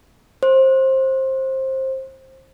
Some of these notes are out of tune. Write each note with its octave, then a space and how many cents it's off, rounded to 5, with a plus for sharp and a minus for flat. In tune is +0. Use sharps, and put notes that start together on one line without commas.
C5 +20